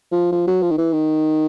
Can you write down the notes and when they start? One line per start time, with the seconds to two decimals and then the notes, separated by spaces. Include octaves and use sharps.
0.12 F3
0.32 F3
0.47 F#3
0.62 F3
0.71 D#3
0.78 E3
0.93 D#3